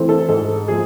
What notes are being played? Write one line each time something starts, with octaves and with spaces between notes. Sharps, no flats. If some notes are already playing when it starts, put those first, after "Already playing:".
Already playing: E3 A3 C4
A4
G#2 A4
F3 A3 G#4